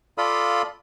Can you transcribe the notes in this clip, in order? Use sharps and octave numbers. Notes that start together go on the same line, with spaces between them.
F4 A4 D5 F5 B5 D#6